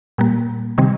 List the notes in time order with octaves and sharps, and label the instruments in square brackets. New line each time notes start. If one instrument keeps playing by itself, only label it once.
[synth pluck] A#2 G3 A#3
C3 D#3 G3 C4